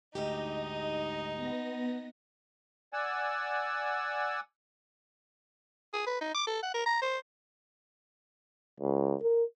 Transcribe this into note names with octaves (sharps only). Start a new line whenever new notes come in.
D2 G#2 D#4 G4 D#5
B3 A#6
D5 F#5 G#5 E6
G#4
B4
D#4
D6
A4
F#5
A#4
A#5
C5
C#2
A#4